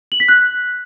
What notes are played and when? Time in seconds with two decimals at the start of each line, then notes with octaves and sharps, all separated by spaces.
0.12 F#7
0.20 B6
0.28 F#6